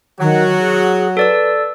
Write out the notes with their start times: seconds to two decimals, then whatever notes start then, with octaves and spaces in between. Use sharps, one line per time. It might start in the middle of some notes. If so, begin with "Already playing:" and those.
0.20 D#3 F#3 F#4
0.59 G#4
1.17 A4 B4 D5 E6